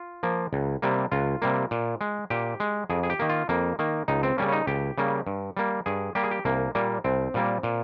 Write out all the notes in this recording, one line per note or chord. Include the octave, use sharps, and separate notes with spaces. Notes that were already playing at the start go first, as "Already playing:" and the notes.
Already playing: F4
F3 A#3
C#2
C3 G3 A#3
C#2 F4
C3 G3 A#3
A#2
G#3
A#2 G4
G#3
F2 G#4
G#4
G4
D#3 A#3
F4
F2 A#3
D#3 A#3
C#2 D#4
C4
C#3 G3 A#3 C#4
C#4
D#4
C#2 G4
C#3 G3 A#3
G2
G3 A#3
G2 G#4
G3 A#3 G4
G#4
G4
C2 A#3
A#2 G3 A#3
C2 C4
A#2 G3 A#3
A#2